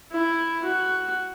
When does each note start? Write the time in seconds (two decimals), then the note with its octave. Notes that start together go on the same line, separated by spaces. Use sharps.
0.11 E4
0.64 F#4